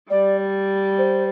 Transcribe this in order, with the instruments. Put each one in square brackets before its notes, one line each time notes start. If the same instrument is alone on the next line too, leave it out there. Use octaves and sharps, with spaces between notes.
[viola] G3 [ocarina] D5
[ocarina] C5